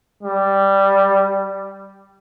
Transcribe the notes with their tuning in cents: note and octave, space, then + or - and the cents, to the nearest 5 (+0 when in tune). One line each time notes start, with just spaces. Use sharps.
G3 +0